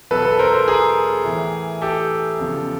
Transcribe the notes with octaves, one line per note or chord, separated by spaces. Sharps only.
E2 B2 F#3 A4 B4
A4 B4
A#4 C5
A#4 C5
G#4 A#4
A2 E3
G4 A4
E2 C#3 F3